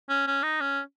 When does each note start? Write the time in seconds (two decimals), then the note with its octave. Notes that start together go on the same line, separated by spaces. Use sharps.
0.09 C#4
0.27 C#4
0.43 D#4
0.61 C#4